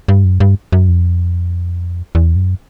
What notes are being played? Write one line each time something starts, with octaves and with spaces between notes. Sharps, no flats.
G2
F#2
G2
F#2
F2
E2
F#2